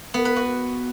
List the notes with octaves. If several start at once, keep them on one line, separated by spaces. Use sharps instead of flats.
B3
B4
F#4